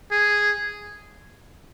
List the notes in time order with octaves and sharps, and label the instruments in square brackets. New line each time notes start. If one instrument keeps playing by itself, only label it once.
[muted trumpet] G#4